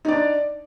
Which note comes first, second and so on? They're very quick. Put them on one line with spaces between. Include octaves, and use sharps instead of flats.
D#4 D5 D4